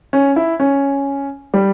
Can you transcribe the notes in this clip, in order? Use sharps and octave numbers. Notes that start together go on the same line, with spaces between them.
C#4
E4
C#4
G3